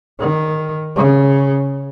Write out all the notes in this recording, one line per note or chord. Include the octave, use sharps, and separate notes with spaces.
D#3
C#3